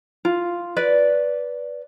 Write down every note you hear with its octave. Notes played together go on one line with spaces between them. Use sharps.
F4
B4 D5